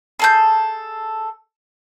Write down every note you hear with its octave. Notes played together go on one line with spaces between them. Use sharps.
G#4 A4 G6